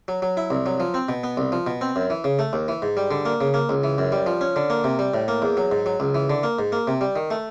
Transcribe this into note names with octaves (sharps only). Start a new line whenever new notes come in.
F#3
F#3
E4
C2
F#3
F3
C4
B2
B3
C2
F3
B2
C4
F#2
E3
C#3
A3
D#2
E3
G#2
G3
D3
A#3
C#3
A#3
C#2
E3
F#2
G3
F3
C#4
D3
A#3
C3
G3
A2
A#3
E2
F#3
G#2
F#3
C#2
E3
D3
A#3
G#2
A#3
C3
G3
D#3
A3